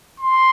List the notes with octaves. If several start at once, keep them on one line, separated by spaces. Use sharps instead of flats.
C6